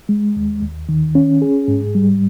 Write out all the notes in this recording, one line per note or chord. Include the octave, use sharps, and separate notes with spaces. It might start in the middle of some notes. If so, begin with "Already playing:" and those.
G#3
D#2
D#2
D#3
C#4
G#4
G#2
G3